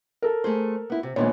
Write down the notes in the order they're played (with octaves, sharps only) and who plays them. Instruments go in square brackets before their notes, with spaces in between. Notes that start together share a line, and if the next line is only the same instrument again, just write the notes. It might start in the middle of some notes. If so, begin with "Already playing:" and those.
[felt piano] A4 A#4
[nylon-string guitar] A3 G#4 C5
B3 E4
C3
[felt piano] A#1 B3 C#5 [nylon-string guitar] A#2 D#3 G#3